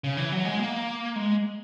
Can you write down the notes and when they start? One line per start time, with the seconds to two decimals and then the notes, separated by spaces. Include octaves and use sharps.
0.04 C#3
0.17 E3
0.32 F#3
0.45 G#3
0.59 A#3
1.16 G#3